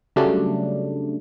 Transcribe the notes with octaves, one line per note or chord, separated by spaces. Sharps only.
C#3 F#3 G3 A3 D4